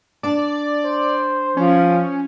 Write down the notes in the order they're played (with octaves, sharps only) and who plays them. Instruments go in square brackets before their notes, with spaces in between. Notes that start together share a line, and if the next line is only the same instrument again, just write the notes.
[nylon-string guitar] D4 A5 [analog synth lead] D5
[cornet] C5
[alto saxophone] F3 [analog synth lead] C#4